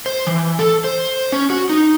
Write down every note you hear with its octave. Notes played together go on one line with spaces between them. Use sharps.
C5
E3
A4
C5
C#4
F#4
D#4